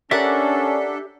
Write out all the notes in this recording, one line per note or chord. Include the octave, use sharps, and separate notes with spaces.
C#4 D4 G4 A4 A#4 D5 E5 F#5